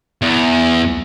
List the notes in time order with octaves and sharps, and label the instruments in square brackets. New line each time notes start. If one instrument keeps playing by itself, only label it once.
[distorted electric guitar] E2